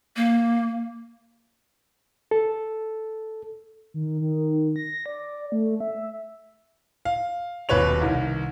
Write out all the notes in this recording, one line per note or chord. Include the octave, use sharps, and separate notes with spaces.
A#3
A4
D#3
D#3
A#6
D5
A3
E5
F5
D#1 B2 B4 C#5 F7
C2 D#3